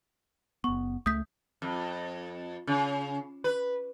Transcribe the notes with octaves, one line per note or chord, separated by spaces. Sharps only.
F#1 B3 C#6
C#2 A3 D#6 G6 B6
F2
C#3
B4